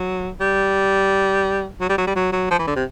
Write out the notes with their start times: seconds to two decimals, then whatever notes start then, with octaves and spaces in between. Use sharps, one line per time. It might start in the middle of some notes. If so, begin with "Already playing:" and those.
Already playing: F#3
0.40 G3
1.81 F#3
1.89 G3
1.98 F#3
2.07 G3
2.16 F#3
2.32 F#3
2.51 F3
2.59 E3
2.67 D3
2.76 C3